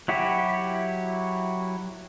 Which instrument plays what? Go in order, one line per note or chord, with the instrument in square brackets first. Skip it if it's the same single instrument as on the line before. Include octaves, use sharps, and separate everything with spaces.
[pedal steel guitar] F#3 E4 F#4 G4